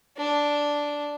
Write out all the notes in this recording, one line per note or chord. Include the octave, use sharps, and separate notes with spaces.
D4